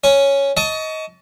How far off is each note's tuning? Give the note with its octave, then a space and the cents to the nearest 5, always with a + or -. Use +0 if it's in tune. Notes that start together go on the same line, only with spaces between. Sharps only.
C#4 +0 C#5 +0
D#5 +20 A5 +0 C#6 +30